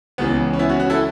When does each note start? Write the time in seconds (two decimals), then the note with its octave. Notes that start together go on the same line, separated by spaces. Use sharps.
0.18 C#2 C#3 E3 B3
0.53 C#4
0.59 B3 E4
0.69 C#4 F#4
0.80 C#4 F#4
0.90 E4 A4